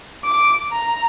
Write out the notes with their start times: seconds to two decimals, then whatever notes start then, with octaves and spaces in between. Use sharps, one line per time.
0.24 D6
0.71 A#5